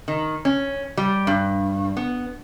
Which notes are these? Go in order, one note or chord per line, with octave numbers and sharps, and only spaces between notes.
D#3
C#4
G3
G2
B3